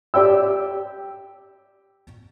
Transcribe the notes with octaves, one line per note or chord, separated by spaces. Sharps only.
G4 D5 G5 E6